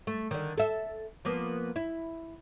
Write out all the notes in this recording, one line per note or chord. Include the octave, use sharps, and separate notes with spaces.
A3
D3 D#3
A4 E5
F3 A#3 B3
E4